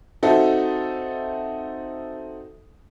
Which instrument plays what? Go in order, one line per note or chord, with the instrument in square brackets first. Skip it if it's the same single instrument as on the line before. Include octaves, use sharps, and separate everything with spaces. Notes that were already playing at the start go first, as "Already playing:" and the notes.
[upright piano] C4 D#4 F#4 A4 E5